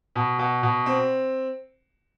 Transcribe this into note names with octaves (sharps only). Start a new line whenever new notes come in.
B2
B2
B2
C4